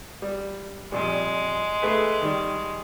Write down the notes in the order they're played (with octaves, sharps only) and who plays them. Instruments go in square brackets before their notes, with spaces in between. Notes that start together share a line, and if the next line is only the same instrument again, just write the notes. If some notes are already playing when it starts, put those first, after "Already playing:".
[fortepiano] G3
[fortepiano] F2 A#2 G3 [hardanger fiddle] G#3
[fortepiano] A3 G#4 B4
D#3 G3